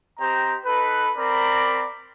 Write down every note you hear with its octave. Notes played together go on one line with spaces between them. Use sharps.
C4 G4 C5 D#5 A#5
D#4 A4 B4
C4 A#4 D5 A#5 B5